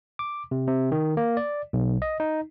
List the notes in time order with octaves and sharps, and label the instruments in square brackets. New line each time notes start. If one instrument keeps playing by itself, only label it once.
[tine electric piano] D6
C3
C3
D#3
A#3
D5
B1
D#5
D#4